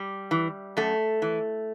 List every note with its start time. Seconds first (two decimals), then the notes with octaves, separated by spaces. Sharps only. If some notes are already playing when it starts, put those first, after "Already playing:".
Already playing: G3
0.31 E3
0.77 F#2 A3
1.22 E3